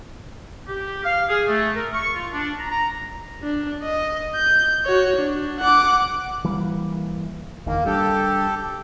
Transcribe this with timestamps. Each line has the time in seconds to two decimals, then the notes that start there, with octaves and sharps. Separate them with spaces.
0.68 G4
1.04 F5
1.29 G#4
1.48 A3
1.76 A#4
1.94 C#6
2.14 F4
2.32 D4
2.59 A#5
2.71 A#5
3.43 D4
3.83 D#5
4.35 G6
4.86 F#4 C#5
5.16 D4
5.59 F#5 D6
6.44 E3 G3 A#3
7.67 F#1 E2 D#3 A#3
7.85 G3 D4 G4 A4